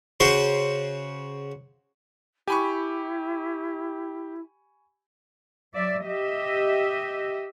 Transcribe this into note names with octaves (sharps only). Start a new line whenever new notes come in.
C#3 F#4 C5 C6
E4 G4 G#5 B5 C#6
F#3 D5 E5
G4 D#5 E5